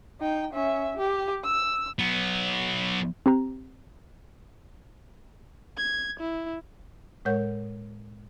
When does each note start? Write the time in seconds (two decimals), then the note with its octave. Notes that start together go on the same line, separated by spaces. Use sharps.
0.21 D#4 G5
0.53 C#4 E5
0.97 G4
1.44 E6
1.99 F#3 B3
3.26 C4 G4 A#5
5.77 G#6
6.20 E4
7.25 A2 G#3 A#4 C#5 F#5 G6